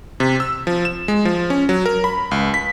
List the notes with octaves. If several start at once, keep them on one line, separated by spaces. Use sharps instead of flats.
C3
E6
F3
E7
G#3
F3
C#4
F#3
A#4
B5
C#2
B6